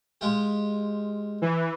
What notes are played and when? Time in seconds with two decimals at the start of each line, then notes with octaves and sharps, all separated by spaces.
0.21 G#3 F4 G4
1.42 E3